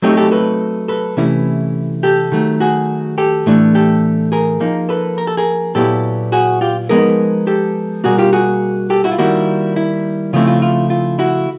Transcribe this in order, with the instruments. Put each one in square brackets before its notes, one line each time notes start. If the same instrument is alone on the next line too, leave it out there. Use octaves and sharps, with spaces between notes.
[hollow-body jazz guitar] F#3 A3 C4 D#4 G4 A4
G4 A4
A4 B4
A4 B4
C3 E3 A3 C#4 E4
G4 A4
D#3 F#3 A3
F#4 G#4
G4 A4
A2 E3 A3 D4
G4 A4
G#4 A#4
F3 A#3 D#4
A4 B4
A#4
A4
G#4 A#4
A#2 F#3 B3 E4 G4 A4
F#4 G#4
F4 G4
F3 G#3 B3 D#4 G#4 A#4
G4 A4
B2 G3 A#3 F#4 G#4
F4 G4
F#4 G#4
G4 A4
E4 F#4
F4
D#3 G3 A#3 E4 F#4
E4
C#3 F3 A3 C4 E4 F4
F4
F4
F4
E4 F#4